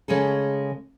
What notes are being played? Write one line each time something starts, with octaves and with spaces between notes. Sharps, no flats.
C#3 G#3 G#4 A4